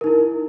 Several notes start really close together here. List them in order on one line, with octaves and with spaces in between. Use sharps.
A#4 D#4 E4